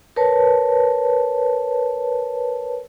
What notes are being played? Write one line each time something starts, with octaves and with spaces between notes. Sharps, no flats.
A#4 B4 C#5 A5